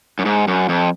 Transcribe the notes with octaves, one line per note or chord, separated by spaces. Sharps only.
F#2
G#2
F#2
F2